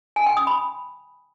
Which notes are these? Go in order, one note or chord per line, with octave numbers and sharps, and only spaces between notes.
G#5
G5
D#6
B5